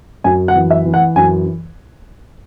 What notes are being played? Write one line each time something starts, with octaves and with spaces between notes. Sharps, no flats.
F#2 G#5
F#5
E3
E5
E3
F#5
F#2 G#5